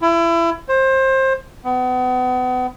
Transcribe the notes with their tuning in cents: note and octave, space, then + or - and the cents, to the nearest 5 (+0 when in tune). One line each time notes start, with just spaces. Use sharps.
E4 +30
C5 +25
B3 +35